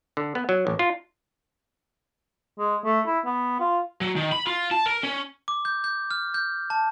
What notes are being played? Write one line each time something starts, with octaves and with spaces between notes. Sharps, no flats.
D3
B3
F#3
A1
F4
G#3
A3
E4
B3
F4
F#3
D#3
B5
F4
A5
A#4
C#4
D6
G6
G6
F6
G6
A5